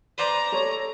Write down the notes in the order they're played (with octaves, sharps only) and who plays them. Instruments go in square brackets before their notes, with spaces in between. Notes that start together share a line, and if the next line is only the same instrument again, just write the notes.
[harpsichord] B4 C5 D5 [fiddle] A#5
[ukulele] A4 C#5